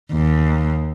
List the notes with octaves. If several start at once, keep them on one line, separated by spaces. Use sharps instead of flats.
D#2